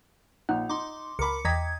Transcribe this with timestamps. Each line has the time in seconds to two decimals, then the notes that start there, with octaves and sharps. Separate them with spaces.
0.49 A#1 D#4 F#5
0.69 D#4 C6 D6
1.19 C#2 A#4 B5 D6 C#7
1.45 E2 D#5 G5 A#5 D#6 G#6 B6